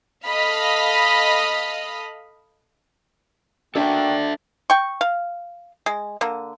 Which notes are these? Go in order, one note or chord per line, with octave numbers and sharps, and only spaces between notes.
A4 D#5 F5 B5
A#3 D4 F#4 A4 D5 E5 G5
G5 C#6
F5
G#3
D3 A#3